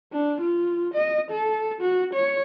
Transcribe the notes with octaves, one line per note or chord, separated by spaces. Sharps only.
D4
F4
D#5
A4
F#4
C#5